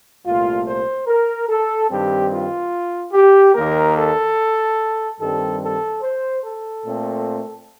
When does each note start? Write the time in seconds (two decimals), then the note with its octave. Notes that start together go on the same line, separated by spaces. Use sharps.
0.25 C2 A#2 A3 F4
0.67 C5
1.07 A#4
1.48 A4
1.90 G2 D#3 G3 C4 G4
2.31 F4
3.13 G4
3.55 D#2 D#3 A#3 A#4
3.96 A4
5.19 G2 D#3 G3 C4 A4
5.61 A4
6.02 C5
6.43 A4
6.84 A#2 A3 C4